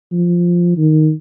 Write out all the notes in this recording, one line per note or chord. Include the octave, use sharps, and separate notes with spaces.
F3
D#3